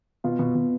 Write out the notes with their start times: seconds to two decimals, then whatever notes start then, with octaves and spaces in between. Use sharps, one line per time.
0.24 B2 F4
0.39 B2
0.55 B2